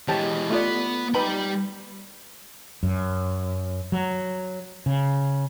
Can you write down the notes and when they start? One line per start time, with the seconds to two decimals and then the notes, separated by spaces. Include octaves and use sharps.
0.08 E3 G#3 G4 C5 C#5 D#5 A5
0.50 A3 B3 F4 D5
1.14 G3 D#4 B4 G5 B5
2.83 F#2
3.92 F#3
4.86 C#3